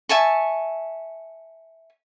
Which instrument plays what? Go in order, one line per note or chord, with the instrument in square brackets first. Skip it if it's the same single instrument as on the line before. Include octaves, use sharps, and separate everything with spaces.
[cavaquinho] E5 G#5 A5 C#6